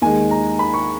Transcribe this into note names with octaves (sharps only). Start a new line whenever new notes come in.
D#2 D#3 G#3 G#5
A#5
B5
C#6